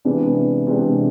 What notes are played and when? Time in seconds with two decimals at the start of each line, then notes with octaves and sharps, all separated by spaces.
0.05 C3 E3 G#3 B3 D4
0.67 C3 E3 G#3 B3 D4